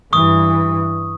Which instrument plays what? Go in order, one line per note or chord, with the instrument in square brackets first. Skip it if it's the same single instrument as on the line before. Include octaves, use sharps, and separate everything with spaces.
[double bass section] G2 E3 [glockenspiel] C#6 D#6